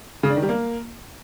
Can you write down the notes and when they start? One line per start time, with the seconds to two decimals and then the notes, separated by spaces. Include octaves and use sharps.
0.23 C#3
0.30 D4
0.36 D#3
0.42 G3
0.49 A#3